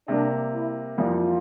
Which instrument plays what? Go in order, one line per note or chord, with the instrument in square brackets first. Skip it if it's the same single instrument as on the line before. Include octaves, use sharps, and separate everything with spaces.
[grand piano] C3 G3 A#3 [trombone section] D4
[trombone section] E4
[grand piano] F2 E3 G3 A#3 [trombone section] F4